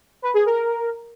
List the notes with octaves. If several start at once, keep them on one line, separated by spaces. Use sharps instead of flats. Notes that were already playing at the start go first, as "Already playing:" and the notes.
B4
G#4
A#4